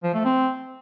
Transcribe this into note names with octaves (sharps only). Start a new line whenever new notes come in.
F3
A3
C4